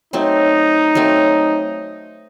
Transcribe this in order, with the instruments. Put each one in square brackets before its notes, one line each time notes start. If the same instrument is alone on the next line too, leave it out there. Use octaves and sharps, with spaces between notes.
[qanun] F#3 A3 C4 [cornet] D#4
[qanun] F#3 A3 C4